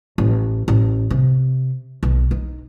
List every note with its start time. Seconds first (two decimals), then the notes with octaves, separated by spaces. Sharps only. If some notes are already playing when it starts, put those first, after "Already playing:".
0.18 A1
0.68 A1
1.10 C3
2.03 B1
2.31 D#4